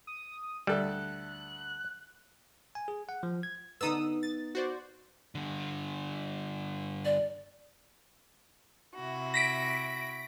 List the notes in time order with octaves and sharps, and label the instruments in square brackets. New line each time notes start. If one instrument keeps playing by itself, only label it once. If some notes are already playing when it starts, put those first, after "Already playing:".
[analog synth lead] D#6
[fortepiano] D2 A4 E5 [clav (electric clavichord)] G3 [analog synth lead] F#6
[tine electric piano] G#5
G#4
F#5
F3
G#6
[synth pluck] D3 D#6 E6 [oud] B3 D#4
[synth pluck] A6
F#4 C5 D5
[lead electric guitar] D3 G3
[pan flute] D5
[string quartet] C3 E4 F#4
[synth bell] A#6 B6 D7